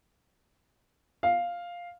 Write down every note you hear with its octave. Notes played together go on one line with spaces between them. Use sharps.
F5